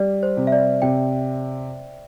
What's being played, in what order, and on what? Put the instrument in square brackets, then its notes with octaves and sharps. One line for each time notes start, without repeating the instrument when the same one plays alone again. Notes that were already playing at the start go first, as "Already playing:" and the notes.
Already playing: [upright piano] G3 [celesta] D5
[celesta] C5
[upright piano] C3
[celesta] E5
D5
[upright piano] C3 [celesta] G5